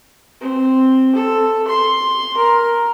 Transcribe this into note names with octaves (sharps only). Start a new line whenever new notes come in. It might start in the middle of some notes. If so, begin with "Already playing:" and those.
C4
A4
C6
A#4